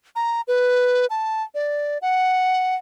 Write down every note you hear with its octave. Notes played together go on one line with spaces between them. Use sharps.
A#5
B4
A5
D5
F#5